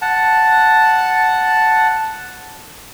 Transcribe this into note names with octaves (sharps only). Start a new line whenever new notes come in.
F#5 A5